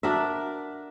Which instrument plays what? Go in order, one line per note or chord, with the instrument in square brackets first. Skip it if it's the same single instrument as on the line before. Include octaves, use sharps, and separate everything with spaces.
[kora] D4 F#4 A#4 E5